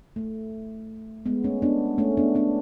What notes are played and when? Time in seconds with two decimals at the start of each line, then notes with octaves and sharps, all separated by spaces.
0.16 A3
1.26 G#3 B3
1.44 A3 C#4
1.62 B3 D4
1.98 A3 C#4
2.17 B3 D4
2.35 B3 D4